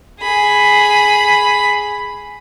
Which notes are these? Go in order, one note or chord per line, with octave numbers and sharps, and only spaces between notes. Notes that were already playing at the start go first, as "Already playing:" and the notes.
G#4 B5